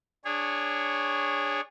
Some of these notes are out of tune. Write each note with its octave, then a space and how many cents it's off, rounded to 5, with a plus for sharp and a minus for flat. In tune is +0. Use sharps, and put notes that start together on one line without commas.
D4 +0 G#4 -20 C#5 +0